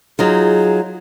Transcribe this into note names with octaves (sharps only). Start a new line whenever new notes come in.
F#3 D#4 F4 G#4